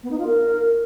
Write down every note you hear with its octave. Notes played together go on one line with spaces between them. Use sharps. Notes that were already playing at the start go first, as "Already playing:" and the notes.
B3
D#4
F4
A#4